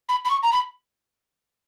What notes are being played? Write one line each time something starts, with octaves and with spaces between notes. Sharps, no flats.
B5
B5
C#6
A#5
B5